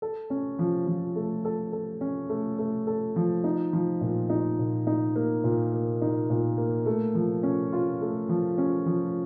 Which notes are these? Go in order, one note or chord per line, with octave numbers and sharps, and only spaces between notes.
A4
C#4
F3
F3
A3
A4
A4
C#4
A3
A3
A4
F3
D#4
F3
A#2
D#4
A#2
D#4
A#3
A#2
A#3
D#4
A#2
A#3
A3
F3
C#4
F4
A3
F3
C#4
F3